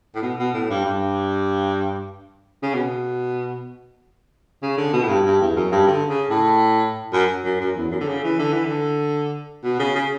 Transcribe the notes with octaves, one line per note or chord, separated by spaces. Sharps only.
A2
B2
B2
A2
G2
G2
C#3
B2
C#3
D3
B2
A2
G2
G2
E2
F#2
G2
D3
C#3
A2
F#2
F#2
F#2
E2
F#2
D3
C#3
E3
D3
E3
D3
B2
C#3
C#3